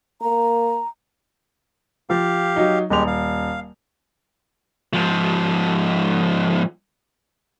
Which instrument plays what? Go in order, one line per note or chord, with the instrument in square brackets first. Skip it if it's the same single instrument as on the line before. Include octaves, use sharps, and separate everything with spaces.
[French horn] A#3 [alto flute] A#5
[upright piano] F3 [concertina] G4 F5
[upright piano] F#3 D#4
[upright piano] D#1 F7 [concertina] G#3 G4
[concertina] F5
[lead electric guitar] G#2 F3